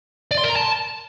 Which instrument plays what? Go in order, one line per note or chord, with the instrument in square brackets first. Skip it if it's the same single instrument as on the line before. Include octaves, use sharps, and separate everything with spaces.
[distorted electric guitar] D5
C6
A#4
A#5
A5